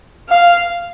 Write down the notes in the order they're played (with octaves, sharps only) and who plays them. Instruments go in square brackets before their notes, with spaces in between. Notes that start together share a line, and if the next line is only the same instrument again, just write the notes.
[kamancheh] F5